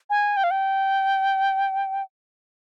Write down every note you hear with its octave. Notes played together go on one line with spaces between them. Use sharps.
G#5
G5
F5
G5